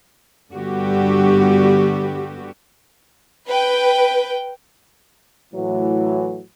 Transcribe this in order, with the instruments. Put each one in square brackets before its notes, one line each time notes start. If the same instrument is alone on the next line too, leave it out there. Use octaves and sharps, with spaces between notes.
[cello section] G2 D3 G3 B3 F#4 G4
[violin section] B4 G5
[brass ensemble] A2 E3 F#3